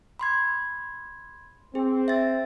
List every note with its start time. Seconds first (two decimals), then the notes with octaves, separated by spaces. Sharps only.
0.19 B5 C6 G#6
1.75 C4 G#4
2.08 E5 A6